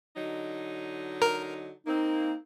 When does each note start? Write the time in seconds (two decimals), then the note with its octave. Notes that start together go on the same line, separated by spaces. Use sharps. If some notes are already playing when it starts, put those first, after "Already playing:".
0.15 D3 F#3 D#4
1.22 A#4
1.87 A#3 C4 D#4